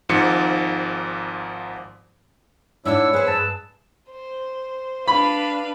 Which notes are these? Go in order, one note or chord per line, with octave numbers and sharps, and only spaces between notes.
G#1 G#2 F3 C#7
G#2 D4 E4 C#5 D#5 E6
B3 G#4 B4 C5
G2 A5
C5
D4 B4 F5 B5